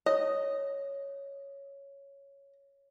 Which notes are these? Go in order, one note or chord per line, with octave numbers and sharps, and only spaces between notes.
C#5 D#5